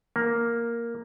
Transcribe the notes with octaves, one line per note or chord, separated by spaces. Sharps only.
A#3